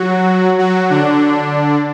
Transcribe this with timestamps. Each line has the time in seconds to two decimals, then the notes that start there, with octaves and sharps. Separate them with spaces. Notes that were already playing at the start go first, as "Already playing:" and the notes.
Already playing: F#3 F#4
0.58 F#3 F#4
0.90 D3 D4